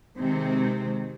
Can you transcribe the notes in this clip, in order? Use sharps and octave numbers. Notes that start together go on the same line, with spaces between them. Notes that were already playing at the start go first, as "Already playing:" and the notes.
C3 D#3 G#3 C4